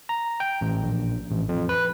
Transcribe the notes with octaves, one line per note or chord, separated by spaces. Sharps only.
A#5
G5
A1
A#1
A1
F2
B4